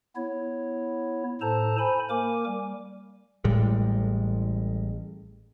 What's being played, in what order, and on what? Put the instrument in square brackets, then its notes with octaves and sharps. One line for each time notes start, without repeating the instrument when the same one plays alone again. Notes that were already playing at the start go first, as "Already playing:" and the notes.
[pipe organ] B3 E4 C#5
A2 A4 C5 A5 A#5
C5 G#5 B5
A#3 A#4 G#5 D6
G3
[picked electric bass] A1 A2 G3 G#3